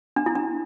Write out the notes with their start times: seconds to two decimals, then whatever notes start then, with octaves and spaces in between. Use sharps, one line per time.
0.16 D4
0.26 E4
0.35 D4